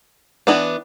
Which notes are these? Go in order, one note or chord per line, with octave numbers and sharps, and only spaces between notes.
E3 B3 D4